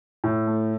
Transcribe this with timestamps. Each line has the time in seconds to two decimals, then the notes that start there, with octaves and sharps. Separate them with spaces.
0.24 A2
0.47 A3